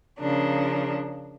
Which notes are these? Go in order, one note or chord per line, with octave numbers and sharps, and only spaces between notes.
C#3 F3 A#3 D4